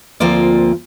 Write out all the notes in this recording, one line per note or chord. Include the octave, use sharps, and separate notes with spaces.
D2 F3 A#3 C4 F4 D5